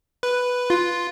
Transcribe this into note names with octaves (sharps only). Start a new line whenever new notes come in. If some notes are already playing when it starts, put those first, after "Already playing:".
B4
F4